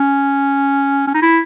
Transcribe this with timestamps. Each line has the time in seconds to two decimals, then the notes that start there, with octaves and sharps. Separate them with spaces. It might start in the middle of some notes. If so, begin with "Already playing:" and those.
Already playing: C#4
1.07 C#4
1.14 D#4
1.22 E4